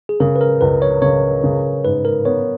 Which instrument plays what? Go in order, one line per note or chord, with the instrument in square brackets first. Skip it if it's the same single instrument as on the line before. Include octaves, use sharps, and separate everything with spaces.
[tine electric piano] G#4
[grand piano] C#3 [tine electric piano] A#4
[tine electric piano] B4
A#4
[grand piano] C#2 [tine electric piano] B4
[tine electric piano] C#5
[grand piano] C#3 [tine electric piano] C#5
[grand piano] C#3
[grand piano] G#2 [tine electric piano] B4
[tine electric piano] A#4
[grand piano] B3 [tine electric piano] C#5